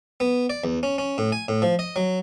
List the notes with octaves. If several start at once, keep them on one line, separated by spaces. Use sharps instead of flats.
B3
D5
E2
C#4
C#4
A2
G#5
A2
F3
D#5
F#3